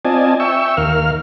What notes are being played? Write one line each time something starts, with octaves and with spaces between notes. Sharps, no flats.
C4 F4 D5 D#5 G#5 A5
E5 G5 C#6 E6
D#2 A#4 F5 F6